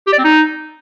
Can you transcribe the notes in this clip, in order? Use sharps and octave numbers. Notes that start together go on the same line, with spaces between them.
G4
D5
C4
D#4